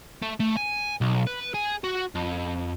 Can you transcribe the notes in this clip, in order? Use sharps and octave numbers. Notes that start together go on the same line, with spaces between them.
A3
A3
G#5
B1
B4
G#4
F#4
F2